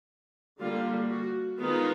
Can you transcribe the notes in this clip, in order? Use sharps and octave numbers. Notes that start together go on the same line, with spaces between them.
D3 G3 A#3 F4
F#4
D#3 G#3 B3 D#4 F4